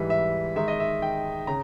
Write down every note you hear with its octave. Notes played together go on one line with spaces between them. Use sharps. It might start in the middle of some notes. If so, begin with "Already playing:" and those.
Already playing: G#2 E3 G3 E5
E5
D#3 G#3 D#4 E5
D#5
E5
G5
C#3 A#5